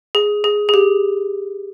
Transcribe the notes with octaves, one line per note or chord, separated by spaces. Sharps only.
G#4
G#4
G#4
G4